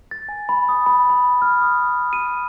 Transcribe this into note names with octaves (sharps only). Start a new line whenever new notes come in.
A6
G#5
B5
D#6
B5
B5
F6
D#6
D#7